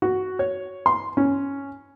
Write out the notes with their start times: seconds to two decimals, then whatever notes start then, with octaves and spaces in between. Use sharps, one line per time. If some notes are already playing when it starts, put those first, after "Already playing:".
0.02 F#4
0.39 C#5
0.86 C6
1.17 C#4